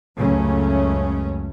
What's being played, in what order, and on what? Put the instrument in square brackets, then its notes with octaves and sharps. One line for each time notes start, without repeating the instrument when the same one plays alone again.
[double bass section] C#2 F#2 C#3 F#3 A3 C#4